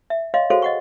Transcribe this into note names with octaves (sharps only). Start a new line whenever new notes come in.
E5
C#5 D#5 F5 C6
F#4 G#4 A4 C5 C#5 F5
D#5 F#5 C#6